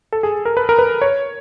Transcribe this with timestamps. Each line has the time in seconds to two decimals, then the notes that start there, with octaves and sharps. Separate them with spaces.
0.13 A4
0.23 G#4
0.45 A#4
0.57 B4
0.69 A#4
0.79 B4
1.02 C#5